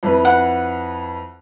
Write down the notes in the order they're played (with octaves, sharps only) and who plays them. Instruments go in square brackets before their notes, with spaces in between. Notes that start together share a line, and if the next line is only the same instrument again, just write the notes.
[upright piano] F2 E4 B4
[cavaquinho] F#5